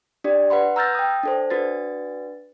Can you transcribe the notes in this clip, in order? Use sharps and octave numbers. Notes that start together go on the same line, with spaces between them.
D4 G4 D5
B4 F#5 B5 C6
A#5 E6 F6 G6 A6 A#6
G5 D#6
D4 A4 C5
D4 F#4 B4 A6